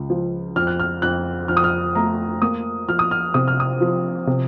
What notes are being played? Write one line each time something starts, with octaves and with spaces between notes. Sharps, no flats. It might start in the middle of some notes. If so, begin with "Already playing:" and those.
Already playing: C#2
F3
F2 F6
F#6
F6
F2 F#6
F2 F6
D#6
F6
A3 A#5
A#3 D#6
F3 F6
D#6
F6
C3 D#6
F6
D#6
F3
C3